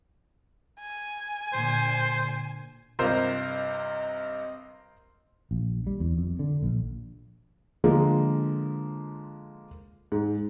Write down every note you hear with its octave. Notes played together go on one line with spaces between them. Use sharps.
G#5
A#2 D3 C5
G2 C3 F4 A#4 C5 D#5
A#1
G3
E2
F2
D3
A#1
D3 F3 G#3 A#3
G#2